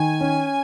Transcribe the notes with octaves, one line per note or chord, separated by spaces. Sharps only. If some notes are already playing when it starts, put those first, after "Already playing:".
Already playing: D#3 G#5
C#4